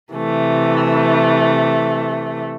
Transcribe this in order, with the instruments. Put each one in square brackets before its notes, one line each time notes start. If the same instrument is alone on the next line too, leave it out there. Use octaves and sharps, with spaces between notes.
[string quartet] C3 E3 A3